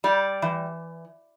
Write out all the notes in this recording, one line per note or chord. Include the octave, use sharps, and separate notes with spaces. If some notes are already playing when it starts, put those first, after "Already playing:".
G3 D5
E3